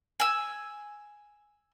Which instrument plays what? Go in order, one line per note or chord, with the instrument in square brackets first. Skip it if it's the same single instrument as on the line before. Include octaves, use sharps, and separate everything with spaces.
[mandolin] G#5 E6